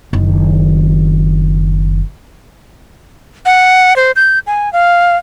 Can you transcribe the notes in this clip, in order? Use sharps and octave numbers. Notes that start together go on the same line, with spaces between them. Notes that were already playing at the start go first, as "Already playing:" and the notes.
F#1 D#3
F#5
C5
G6
G#5
F5